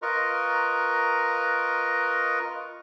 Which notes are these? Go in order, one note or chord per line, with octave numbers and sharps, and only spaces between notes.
F4 A#4 B4 D#5 A#5 C#6